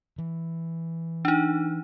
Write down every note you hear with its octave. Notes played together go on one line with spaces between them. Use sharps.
E3
D4 D#4